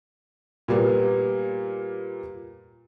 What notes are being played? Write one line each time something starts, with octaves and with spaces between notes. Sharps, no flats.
A#2 G3 A#3 B3